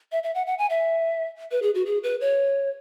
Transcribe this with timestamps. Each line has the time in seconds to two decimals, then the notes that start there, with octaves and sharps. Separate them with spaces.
0.12 E5
0.23 E5
0.35 F#5
0.47 F#5
0.58 G#5
0.70 E5
1.51 B4
1.62 G#4
1.75 F#4
1.86 G#4
2.03 B4
2.21 C#5